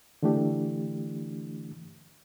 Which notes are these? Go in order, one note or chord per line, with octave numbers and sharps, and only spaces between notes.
D3 E3 A3 D4 G4